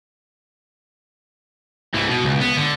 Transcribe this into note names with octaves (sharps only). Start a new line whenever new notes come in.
C2 E3
B2
C#2
B3
D3